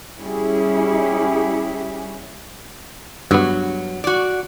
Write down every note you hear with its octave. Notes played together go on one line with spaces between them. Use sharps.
G3 C#4 E4 G4 G#4
G2 F#3 B3
F#4 D5